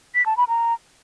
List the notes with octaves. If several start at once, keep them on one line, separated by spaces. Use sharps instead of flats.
B6
A5
B5
A#5